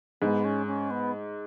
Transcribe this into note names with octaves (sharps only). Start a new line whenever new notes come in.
G#2 B3
C#4
C#4
B3